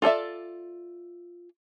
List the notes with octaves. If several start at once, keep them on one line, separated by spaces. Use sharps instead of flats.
F4 A4 D5 E5